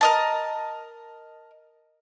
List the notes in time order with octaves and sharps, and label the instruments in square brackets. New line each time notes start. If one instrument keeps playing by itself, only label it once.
[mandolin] A#4 D#5 A5